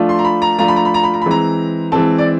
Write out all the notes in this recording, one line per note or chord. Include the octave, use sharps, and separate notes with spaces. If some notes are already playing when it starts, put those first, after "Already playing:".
Already playing: F3 A3 D4 F4
C6
A#5
B5
A#5
F3 A3 D4 F4 A#5
B5
A#5
B5
A#5
B5
A#5
B5
E3 G#3 C4 A#5
E3 G#3 C4 A5
D5